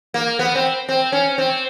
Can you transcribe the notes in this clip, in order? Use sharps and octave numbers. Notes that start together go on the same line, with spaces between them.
A#3
B3
C4
C4
C#4
C4